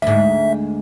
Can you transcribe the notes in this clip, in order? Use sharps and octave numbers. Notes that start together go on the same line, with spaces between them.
D2 G#2 E5